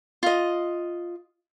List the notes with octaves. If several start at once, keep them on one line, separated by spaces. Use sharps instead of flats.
F4 D#5